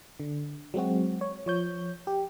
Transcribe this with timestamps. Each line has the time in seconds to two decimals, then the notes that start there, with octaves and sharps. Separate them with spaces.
0.20 D3
0.74 F#3 G#3 C4 F#4
1.21 C#5
1.46 F3 C#5 G6
2.07 G4